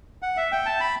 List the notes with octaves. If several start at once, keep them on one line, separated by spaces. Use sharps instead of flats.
F#5
E5
G5
A5
B5